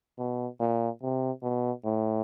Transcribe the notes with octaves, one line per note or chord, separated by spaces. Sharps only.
B2
A#2
C3
B2
A2